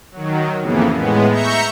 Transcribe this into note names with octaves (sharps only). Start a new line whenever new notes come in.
D#3 F#3
F2 A2 C#3 E3 A#3 B3
A2 G#3 B3
E5 A#5 C#6 G6 C#7